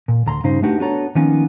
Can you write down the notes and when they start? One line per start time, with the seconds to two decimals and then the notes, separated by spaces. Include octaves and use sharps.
0.08 A#2
0.26 D2 A#5 C6
0.44 G2 C#3 D#4 C5
0.62 A3 D4 D#4 F#4 G4 B4
0.80 B3 D4 F#4 A4 C#5 A#5
1.15 D#3 F3 A#3 B3 C#4 D#4